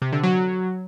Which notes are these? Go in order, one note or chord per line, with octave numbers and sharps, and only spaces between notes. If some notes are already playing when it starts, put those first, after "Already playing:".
C3
D3
F#3